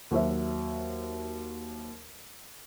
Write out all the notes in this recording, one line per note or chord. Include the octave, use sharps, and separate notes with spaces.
D#2 F#3 F#4 C5 E5